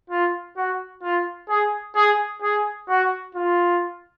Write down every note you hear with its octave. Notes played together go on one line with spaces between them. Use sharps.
F4
F#4
F4
G#4
G#4
G#4
F#4
F4